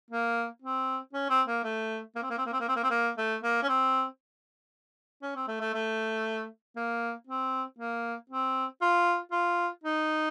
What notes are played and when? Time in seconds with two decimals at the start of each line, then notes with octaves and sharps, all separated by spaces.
0.10 A#3
0.62 C4
1.13 C#4
1.30 C4
1.48 A#3
1.64 A3
2.16 A#3
2.23 C4
2.30 A#3
2.38 C4
2.46 A#3
2.53 C4
2.60 A#3
2.69 C4
2.76 A#3
2.84 C4
2.90 A#3
3.18 A3
3.43 A#3
3.63 C#4
3.69 C4
5.22 C#4
5.36 C4
5.48 A3
5.61 A3
5.74 A3
6.76 A#3
7.27 C4
7.79 A#3
8.30 C4
8.82 F4
9.32 F4
9.84 D#4